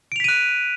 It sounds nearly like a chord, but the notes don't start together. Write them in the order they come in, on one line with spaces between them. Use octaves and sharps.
D7 F7 B6 D#7 F#6